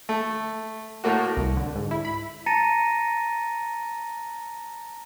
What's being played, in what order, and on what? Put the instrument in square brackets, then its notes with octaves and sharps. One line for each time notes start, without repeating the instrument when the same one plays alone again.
[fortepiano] A3
A2 A3 A#3 F#4
[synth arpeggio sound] C2
D3
G#2
E4
B5
[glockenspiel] A5 A#5 A6 A#6 C#7 D#7